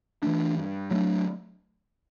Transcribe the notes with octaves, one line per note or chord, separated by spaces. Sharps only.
E3 A3 D4
G2
F#3 A3 D4